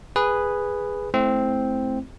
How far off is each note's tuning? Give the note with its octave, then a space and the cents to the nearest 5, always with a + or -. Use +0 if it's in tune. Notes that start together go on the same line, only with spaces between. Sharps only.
G#4 -10 B4 +0
A3 -25 C4 +0 E4 +0